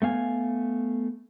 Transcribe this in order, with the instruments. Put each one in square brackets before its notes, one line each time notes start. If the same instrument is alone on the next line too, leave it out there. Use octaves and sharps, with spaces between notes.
[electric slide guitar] A3 B3 F5 G#5